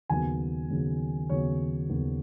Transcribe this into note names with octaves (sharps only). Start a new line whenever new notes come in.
D#2 C#3 F#3 B3 G#5
D#2 C#3 F#3 B3
D#2 C#3 F#3 B3 C#5
D#2 C#3 F#3 B3